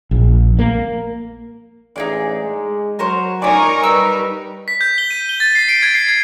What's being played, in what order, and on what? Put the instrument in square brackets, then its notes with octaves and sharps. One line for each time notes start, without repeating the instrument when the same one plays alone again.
[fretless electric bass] A#1
A#3
[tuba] A1 [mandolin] D#4 G#4 D5
[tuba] G#3
[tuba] F#3 [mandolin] A#4 C5 C#5
[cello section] D#4 A#4 [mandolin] C#5 D5 [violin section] G#5 C#6 D#6
[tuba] G3 [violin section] B4 [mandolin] E6
[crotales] B6
G6
G7
D#7
G7
A6
C7
D7
G#6
C7
G#6